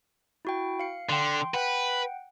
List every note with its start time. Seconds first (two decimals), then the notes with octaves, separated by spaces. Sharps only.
0.45 E4 F#4 G5
0.79 F5 C#7
1.09 D3 G5 C6
1.54 B4 F#5 G5